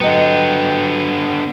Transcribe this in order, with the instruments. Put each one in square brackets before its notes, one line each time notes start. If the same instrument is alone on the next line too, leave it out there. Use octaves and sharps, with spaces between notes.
[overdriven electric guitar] D3 B3 [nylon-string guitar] F#3 D#5 [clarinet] G5